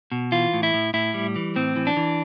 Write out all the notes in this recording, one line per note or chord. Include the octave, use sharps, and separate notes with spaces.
B2
E3 F4
A2
E4
A2
A2 E4
G3
E3
A2 C4
E3
D4
E3